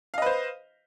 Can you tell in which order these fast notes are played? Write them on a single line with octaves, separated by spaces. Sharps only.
F5 D#5 B4 C5